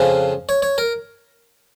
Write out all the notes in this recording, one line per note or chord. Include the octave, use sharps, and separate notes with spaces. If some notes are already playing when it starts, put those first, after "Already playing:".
Already playing: F2 C#3 F3
C#5
C#5
A#4